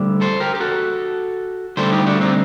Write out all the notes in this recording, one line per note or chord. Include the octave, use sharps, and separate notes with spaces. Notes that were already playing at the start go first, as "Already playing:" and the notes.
Already playing: D2 D3 G3
A4 C5
G4 A#4
G4
F#4 A4
D2 D3 G3 A4 C5
D#4 G4
D4 F#4
C4 D#4